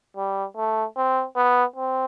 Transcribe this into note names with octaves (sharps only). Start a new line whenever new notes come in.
G3
A3
C4
B3
C4